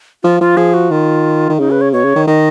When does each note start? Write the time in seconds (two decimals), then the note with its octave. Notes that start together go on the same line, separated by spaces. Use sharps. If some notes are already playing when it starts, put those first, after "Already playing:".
0.23 F3 F4
0.41 F3 F4
0.57 F3 G#4
0.74 F#4
0.91 D#3 F4
1.49 D#3
1.59 C#3 D#4
1.71 B4
1.81 C#5
1.93 B2 C#5
2.04 C#3
2.16 D#3
2.27 D#3 D#5